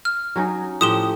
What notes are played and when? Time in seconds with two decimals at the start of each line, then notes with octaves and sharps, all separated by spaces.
0.05 F6
0.36 F#3 C#4 D#4
0.81 A2 F3 G4 D#6 E7 G7